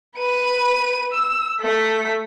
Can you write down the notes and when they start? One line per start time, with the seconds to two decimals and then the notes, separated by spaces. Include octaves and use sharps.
0.17 B4 D#7
1.13 E6
1.60 A3 B6